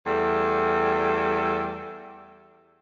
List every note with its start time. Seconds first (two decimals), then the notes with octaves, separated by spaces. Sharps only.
0.06 E2 G3 A3 A4